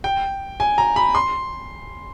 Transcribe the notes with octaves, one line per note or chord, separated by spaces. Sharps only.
G5
G#5
A#5
B5
C6